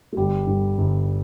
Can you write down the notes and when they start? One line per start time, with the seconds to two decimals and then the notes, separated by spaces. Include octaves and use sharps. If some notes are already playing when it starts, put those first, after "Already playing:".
0.13 A3
0.17 G1 G3
0.47 G2 D3
0.78 G1